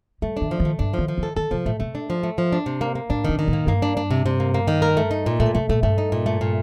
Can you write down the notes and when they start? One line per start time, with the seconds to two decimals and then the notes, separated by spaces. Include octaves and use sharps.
0.22 G3 A3
0.37 D#3 D4
0.51 F3
0.60 D#3
0.65 A3
0.79 G2 D4
0.94 F3
0.99 D#3
1.08 F3
1.18 D#3
1.23 A4
1.37 D#3 A4
1.51 C3 F3
1.66 A2 A3
1.80 C3 A3
1.95 D4
2.10 F3
2.23 A3
2.38 F3
2.52 D4
2.66 C3
2.81 A#3
2.95 A#3
3.10 A2 D4
3.24 C3 D#3
3.39 D#3
3.48 A2
3.53 A#3
3.67 G2 A#3
3.82 D4
3.97 D4
4.11 C3
4.26 C3
4.40 A#3
4.54 A#3
4.68 D#3
4.82 A#4
4.97 A3
5.11 D#4
5.26 A#2
5.40 A2 A3
5.55 C3 A3
5.69 A#2 A3
5.83 G2 A3
5.98 D#4
6.12 A#2
6.26 A3
6.41 A#2